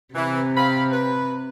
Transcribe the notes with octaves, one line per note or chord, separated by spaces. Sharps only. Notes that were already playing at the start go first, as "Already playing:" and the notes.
C3 E3
C4 F5 B5
B4